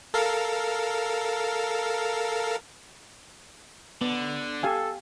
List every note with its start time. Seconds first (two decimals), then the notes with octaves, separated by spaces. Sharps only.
0.14 A4 A#4 F5
4.01 D3 B3
4.63 G4 A4 F5 G#5